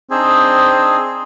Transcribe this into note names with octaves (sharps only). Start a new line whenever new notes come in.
C4 D4 D#4 G#4